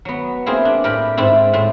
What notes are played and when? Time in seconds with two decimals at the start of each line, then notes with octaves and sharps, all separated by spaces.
0.05 F#3 B3
0.46 A#3 C4 E4 G#4
0.65 D4
0.84 A2 E4 G4 A#4 D5
1.17 G#2 C4 E4 D5
1.53 A2 C4